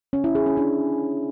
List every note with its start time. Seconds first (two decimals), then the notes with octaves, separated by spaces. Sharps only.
0.13 C#4
0.24 E4
0.35 G#4
0.46 C#4
0.57 D4